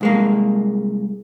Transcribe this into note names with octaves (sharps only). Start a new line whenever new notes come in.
C2 G#3 A#3